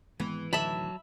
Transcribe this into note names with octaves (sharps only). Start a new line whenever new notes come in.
G#1 E3 G#3 B3
D1 D3 D#3 F#3 E5 A5 B5